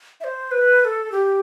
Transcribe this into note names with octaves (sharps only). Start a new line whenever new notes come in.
E5
C5
B4
B4
A4
G4